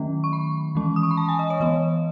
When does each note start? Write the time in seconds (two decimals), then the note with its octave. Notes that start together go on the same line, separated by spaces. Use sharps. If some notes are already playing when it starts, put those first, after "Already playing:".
Already playing: D#3 F#3 A3 C#4
0.24 C#6
0.33 B5
0.75 E3 G#3 C#4
0.96 D#6
1.03 C#6
1.11 B5
1.17 A5
1.29 G#5
1.39 D#5
1.50 C#5
1.60 E3 B3 D#5